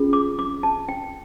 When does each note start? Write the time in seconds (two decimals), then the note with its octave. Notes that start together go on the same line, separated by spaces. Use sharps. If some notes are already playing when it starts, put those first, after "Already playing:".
Already playing: C#4 F4 G#4
0.13 D6
0.39 D6
0.63 A5
0.89 G5